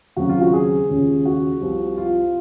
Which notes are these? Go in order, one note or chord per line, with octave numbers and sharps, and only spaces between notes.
D#2 C#3 F#3 C4 F4 F#4
F4
F#4
G#4
D#2 C#3 G#3 C#4 F4
F#4
C2 C3 F3 C4
F4